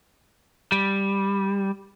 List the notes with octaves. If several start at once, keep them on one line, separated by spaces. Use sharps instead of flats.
G3